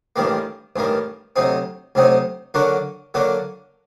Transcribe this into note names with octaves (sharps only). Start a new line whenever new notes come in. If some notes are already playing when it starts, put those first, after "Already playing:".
A1 G2 D#3 G3 A#3
A1 G2 D#3 G3 A#3
D2 C3 F#3 C4 D#4
D2 C3 F#3 C4 D#4
D3 F#3 A#3 D4 F#4
D3 F#3 A#3 D4 F#4